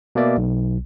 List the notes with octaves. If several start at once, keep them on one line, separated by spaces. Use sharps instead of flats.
B2 A#3 D5 E5
B1